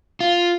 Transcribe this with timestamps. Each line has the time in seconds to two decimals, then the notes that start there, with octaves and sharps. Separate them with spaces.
0.20 F4